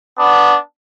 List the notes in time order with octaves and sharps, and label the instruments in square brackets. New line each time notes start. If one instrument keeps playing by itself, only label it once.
[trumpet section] B3 D4